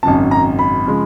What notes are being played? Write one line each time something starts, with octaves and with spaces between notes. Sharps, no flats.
G#1 F#2 C#3 A5
A#5
B5
C#3 F3 G#3